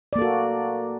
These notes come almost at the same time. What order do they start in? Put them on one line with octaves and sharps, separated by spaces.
D5 A#3 A4 F#4